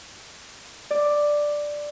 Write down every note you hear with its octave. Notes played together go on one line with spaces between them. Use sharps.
D5